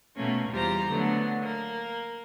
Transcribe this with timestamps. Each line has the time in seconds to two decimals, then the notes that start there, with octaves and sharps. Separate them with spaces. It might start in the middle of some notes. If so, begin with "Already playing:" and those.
0.15 B2 A3 A#3 C#4
0.49 E2 G3 F4 G4 C5 A#5
0.90 D3 F#3 A3 B3
1.42 A#3